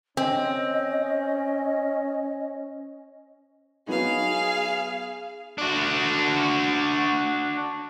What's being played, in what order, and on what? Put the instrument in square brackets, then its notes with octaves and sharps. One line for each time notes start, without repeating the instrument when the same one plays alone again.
[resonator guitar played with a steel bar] C4 [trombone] C#4 [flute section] D#5
[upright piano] F#3 B3 D#4 [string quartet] G#4 F5
[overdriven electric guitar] D4 F#4